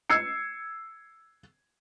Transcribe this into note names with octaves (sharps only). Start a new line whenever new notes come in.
E6 G#6 C7 C#7